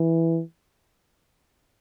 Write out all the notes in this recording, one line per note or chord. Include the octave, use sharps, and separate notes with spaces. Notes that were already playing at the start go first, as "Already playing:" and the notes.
Already playing: E3